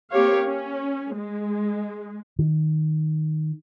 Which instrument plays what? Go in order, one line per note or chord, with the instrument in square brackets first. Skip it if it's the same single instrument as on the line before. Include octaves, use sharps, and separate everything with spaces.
[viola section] A#3 C4 G4 C#5 F5
C#4
G#3
[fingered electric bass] D#3